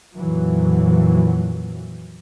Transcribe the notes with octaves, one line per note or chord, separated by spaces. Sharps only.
F2 A#2 E3 F#3